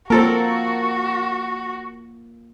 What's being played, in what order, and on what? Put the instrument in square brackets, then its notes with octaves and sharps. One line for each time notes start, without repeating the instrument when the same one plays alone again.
[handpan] A#3 F4 [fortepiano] C4 A4 A#4 [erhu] F#4